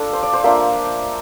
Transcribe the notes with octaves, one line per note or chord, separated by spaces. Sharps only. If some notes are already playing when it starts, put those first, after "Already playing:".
Already playing: D4 F4 A4
C5
D5
C5
A#3 D4 F4 E5